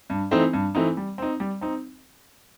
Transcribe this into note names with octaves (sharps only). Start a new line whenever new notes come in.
G2
E3 A3 C4 D#4
G2
E3 A3 C4 D#4
G3
C4 D#4
G3
C4 D#4